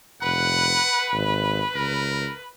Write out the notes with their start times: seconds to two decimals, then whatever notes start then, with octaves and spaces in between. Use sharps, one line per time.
0.22 F1 B4 F#5
1.12 G#1
1.74 C#2 A#4